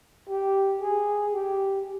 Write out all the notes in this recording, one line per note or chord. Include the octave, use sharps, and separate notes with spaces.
G4
G#4
G4